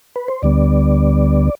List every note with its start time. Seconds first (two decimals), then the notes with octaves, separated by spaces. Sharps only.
0.16 B4
0.28 C5
0.43 D2 D3 G3 B3 D5